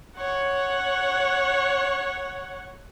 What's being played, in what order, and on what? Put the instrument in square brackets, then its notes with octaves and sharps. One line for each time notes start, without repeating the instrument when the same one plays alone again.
[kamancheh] C#5 F#5